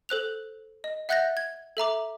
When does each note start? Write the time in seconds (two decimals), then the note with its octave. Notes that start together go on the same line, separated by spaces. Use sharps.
0.09 A4 C5 F#6 F7
0.84 D#5
1.09 E5 F#5 F#6 G6 A6 A#6
1.37 G#6
1.77 A4 E5 A#5 D6